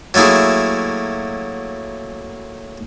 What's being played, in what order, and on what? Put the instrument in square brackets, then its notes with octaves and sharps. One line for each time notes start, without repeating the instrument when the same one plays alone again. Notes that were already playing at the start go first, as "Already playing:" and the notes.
[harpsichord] F#3 A3 A#3 E4 G#4